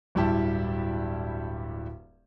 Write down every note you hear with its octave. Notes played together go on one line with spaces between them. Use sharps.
D1 G2 G3 E4 G4 A5